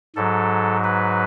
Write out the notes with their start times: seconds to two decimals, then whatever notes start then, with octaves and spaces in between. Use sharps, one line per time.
0.16 G#2 F#3 A4
0.84 B4